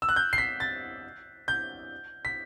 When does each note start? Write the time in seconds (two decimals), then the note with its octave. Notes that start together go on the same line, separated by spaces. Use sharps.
0.02 E6
0.09 F#6
0.16 G6
0.33 C7
0.38 B6
0.60 A6
1.48 G6
2.25 B6